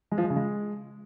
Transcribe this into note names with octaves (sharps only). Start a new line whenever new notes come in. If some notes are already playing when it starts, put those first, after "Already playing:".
G#3
F3
G#3
C#3
G#3